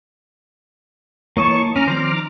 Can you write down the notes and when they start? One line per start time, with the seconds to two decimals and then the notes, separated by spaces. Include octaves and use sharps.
1.37 E3 A#3 C#5 D#5 A5 C#6
1.76 C#4 A#5 D6 F6
1.88 D#3 F3 C4 C5 D5
2.14 D#4